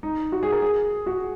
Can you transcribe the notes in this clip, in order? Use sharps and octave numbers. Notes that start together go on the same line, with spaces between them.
D#4
F#4
G#4
A#4
G#4
F#4